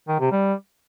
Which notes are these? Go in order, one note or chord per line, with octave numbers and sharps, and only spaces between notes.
D#3
C3
G3